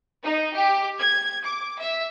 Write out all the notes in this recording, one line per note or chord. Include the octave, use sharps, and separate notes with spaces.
D#4
G4
G#6
D6
E5